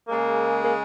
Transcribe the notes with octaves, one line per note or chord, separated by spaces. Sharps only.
C#3 G#3 A#3
A#3